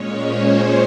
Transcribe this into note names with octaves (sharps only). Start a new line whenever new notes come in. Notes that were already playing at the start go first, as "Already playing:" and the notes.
Already playing: A#2 G#3 C#4 C#5
C5